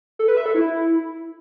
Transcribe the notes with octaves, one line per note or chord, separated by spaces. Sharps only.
A4
B4
E5
A4
E4